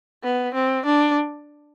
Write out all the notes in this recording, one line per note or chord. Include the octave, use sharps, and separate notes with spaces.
B3
C4
D4